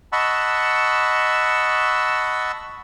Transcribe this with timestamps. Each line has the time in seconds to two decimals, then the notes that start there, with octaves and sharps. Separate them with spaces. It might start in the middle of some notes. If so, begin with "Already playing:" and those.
0.12 D#5 F#5 A5 B5 C#6 E6